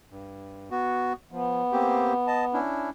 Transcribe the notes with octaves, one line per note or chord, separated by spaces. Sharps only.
G2
B3 F#4
F3 B3
A#3 C4 G4
D#5 A5
C#4 D4 E4